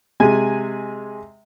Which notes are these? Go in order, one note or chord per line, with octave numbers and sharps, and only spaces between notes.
C3 G#3 G#5